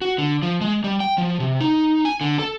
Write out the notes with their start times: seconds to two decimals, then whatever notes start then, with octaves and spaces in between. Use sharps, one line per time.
0.02 F#4
0.18 D3
0.42 F3
0.61 G#3
0.84 G3
1.00 G5
1.18 F3
1.40 C3
1.61 D#4
2.05 G#5
2.21 D3
2.39 A4